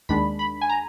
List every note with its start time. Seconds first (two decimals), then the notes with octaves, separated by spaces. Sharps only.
0.09 D#2 D#3 G#3 D4 B5
0.39 B5
0.61 G#5
0.69 A#5